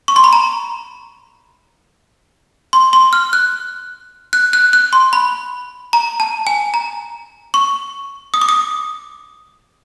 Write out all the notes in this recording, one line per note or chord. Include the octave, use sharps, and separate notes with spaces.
C#6
C6
B5
A#5
C6
C6
F6
F#6
F#6
F#6
F#6
C6
B5
A#5
A5
G#5
A#5
C#6
D#6
D6
D#6